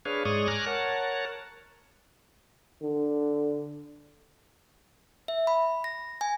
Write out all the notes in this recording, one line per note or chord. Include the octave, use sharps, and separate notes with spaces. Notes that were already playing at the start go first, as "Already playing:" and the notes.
D4 G#4 B4 C#5 F5
G#2 G#3 C#5 D5 C#6 D#6
G#5 A#5 D6 F6 F#6
A#4 C#5 F#5 A5
D3
E5
B5
A#6
G#5